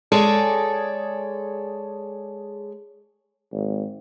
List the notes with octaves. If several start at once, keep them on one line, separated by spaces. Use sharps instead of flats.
G#3 G#4 A4 C#5 D5
G#1